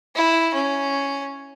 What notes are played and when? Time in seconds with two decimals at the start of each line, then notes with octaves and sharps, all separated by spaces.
0.15 E4
0.54 C#4